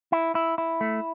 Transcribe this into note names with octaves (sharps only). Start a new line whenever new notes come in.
E4
E4
E4
A3